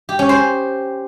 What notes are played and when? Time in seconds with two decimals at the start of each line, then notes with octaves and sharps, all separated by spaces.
0.09 G4
0.19 C#4
0.29 C5